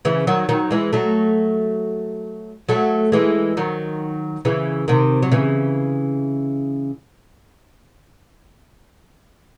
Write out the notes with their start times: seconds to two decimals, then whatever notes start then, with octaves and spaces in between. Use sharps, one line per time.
0.05 C#3 E3
0.27 D#3 F#3
0.49 D#3 F#3
0.71 E3 G#3
0.93 F#3 A3
2.69 F#3 A3
3.12 E3 G#3
3.57 D#3 F#3
4.45 C#3 E3
4.88 C3 D#3
5.22 F#3
5.32 C#3 E3